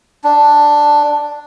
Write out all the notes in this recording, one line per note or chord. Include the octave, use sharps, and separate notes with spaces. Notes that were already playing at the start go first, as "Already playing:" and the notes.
D4